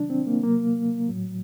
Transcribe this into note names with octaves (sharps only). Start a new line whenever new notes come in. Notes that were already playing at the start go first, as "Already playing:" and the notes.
Already playing: C3 D#3 F#3 D4
C4
A#3
C3 F#3 A#3
A2 F#3